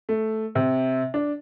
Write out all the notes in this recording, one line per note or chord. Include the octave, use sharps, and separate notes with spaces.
A3
C3
D4